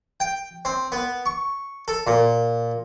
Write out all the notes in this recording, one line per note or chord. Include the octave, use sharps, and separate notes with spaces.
G5
C4
B3
C#6
A4
A#2